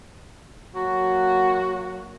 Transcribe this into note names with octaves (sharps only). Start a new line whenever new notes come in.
F#3 A#3 F#4